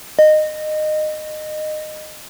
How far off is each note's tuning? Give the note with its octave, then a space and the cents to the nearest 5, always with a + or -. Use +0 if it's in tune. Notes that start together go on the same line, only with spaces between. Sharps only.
D#5 -20